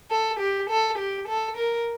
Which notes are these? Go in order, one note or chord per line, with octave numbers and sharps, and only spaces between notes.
A4
G4
A4
G4
A4
A#4